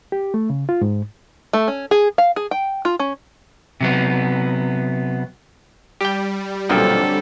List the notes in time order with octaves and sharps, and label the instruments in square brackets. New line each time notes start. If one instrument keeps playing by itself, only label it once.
[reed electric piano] G4
A3
C#3
F4
G#2
[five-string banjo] A3
C#4
G#4
F5
G#4
G5
F4
C#4
[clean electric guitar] C3 F#3 B3
[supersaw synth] G3 [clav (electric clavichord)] G4 G5
[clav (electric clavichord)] B1 A#2 F3 [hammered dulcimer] D3 F#3 C4 [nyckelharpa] A4